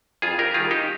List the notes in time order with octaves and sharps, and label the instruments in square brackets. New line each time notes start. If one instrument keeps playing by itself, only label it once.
[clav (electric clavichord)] F2 F4 G#4
G4 A#4
D#3 G3 F4 G#4
D#4 G4